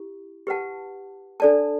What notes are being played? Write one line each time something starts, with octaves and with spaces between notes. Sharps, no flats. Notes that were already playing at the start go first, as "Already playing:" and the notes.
Already playing: E4 G4
G4 B4 F#5 A5
D4 A4 D5 A5